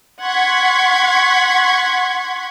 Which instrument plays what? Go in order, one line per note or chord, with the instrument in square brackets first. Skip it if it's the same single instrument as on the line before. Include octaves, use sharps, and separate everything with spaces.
[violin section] F#5 C6 C#6 G#6 B6